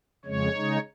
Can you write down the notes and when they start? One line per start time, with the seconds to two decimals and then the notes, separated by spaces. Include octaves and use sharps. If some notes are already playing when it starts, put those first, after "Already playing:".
0.25 F2 C#3 G#3 C#5
0.55 C#3 G#3 D#4